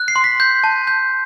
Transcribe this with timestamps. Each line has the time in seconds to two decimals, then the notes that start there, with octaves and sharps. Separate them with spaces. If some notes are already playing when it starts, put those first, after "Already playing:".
Already playing: F#6
0.08 C7
0.16 C6
0.24 B6
0.40 G6
0.64 A5
0.87 G6